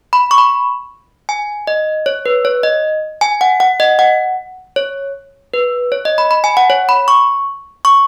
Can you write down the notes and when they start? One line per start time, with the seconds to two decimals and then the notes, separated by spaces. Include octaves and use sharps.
0.13 B5
0.31 C#6
0.38 B5
1.29 G#5
1.67 D#5
2.06 C#5
2.26 B4
2.45 C#5
2.63 D#5
3.21 G#5
3.41 F#5
3.60 F#5
3.80 D#5
3.99 F#5
4.76 C#5
5.54 B4
5.92 C#5
6.05 D#5
6.18 B5
6.31 B5
6.44 G#5
6.57 F#5
6.70 C#5
6.89 B5
7.08 C#6
7.85 C#6